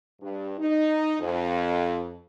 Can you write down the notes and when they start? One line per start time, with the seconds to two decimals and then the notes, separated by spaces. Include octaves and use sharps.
0.21 G2
0.58 D#4
1.20 F2